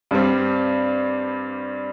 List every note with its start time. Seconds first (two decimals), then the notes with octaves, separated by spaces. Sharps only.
0.11 G2 G3 C4